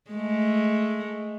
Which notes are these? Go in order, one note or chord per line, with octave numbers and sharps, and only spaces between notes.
G#3 A3